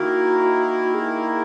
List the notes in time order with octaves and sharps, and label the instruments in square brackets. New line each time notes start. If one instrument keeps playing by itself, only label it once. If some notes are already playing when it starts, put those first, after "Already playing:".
Already playing: [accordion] D#3 A#3 E4 A#4 [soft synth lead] F#4
[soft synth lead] G#4